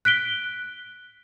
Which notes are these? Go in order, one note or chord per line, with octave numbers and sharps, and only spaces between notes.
F#6 B6 D7 G7